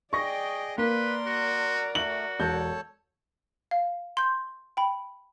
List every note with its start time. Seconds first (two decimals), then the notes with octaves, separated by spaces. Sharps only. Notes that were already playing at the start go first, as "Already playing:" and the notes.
0.13 G#4 D5 D#5 G5 C#6 A#6
0.78 A#3 A#4 B4 D5 C6
1.26 F#4
1.95 A3 F#4 F#7
2.40 E1 A4 C#5 A5 G6
3.71 F5
4.17 C6 G6
4.77 G5 B5